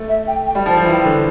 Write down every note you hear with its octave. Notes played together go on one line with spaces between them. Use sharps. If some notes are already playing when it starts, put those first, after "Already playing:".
Already playing: A3
E5
G5
G5
G3
F3 A5
F3
E3
G5
D3